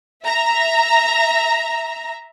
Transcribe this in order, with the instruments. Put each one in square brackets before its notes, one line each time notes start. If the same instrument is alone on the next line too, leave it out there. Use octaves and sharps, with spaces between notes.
[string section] E5 A#5